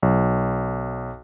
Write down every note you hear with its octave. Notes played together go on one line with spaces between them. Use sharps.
B1